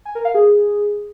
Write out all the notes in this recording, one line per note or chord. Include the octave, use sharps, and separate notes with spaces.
G#5
A#4
F5
G#4